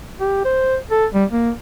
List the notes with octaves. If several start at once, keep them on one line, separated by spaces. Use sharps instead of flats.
G4
C5
A4
G3
A#3